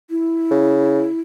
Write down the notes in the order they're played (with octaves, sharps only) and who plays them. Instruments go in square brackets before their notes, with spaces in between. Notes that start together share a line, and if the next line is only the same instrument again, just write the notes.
[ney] E4
[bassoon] C#3